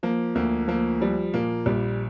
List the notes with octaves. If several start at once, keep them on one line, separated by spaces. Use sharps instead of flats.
F3 A#3
D2 A#3
F3 A#3
F3 G3
A#2 A#3
A#1 G3